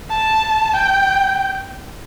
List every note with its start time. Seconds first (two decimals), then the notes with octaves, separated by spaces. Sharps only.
0.10 A5
0.74 G5